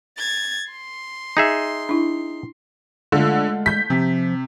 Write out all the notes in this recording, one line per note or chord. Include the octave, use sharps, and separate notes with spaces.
G#6 A6
C6
D#4 G#4 E5
D4 E4
D3 G#3 A3 F4
G6 B6
C3 F3